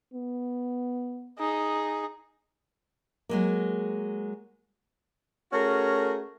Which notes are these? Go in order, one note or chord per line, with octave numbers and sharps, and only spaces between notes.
B3
D#4 G#4
F#3 G#3 A#3
A3 C#4 F#4 G#4 A#4